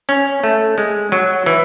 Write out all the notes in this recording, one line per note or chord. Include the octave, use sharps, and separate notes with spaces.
C#4
A3
G#3
F#3
E3